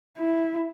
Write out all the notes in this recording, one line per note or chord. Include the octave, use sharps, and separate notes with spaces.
E4